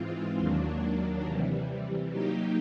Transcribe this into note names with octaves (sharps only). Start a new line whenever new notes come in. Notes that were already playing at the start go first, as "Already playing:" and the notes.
Already playing: G#2 E3 G#3 C4 F4
D#2 D#3 F#3 A#3 D4
C3 E3 G3
F#3 A#3 D#4 G4